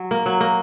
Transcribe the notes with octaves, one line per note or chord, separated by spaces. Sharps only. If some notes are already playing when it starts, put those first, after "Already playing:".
Already playing: F#3
A#3
F#3
A#3